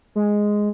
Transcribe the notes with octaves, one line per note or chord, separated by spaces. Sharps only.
G#3